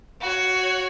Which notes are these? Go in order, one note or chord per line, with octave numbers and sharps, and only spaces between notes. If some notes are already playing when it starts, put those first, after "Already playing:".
F#4 C#5